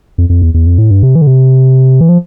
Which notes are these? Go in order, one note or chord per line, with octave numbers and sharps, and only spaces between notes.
F2
F2
E2
E2
F2
A2
G2
C3
E3
D3
C3
E3
F3